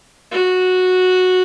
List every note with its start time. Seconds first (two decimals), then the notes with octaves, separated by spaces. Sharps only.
0.31 F#4